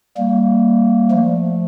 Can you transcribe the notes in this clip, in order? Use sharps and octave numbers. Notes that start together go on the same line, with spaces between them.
G3 A#3
F3 A3